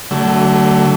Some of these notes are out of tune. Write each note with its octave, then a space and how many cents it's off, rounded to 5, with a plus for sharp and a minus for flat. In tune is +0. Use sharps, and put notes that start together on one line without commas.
D3 -10 F#3 +30 A3 +20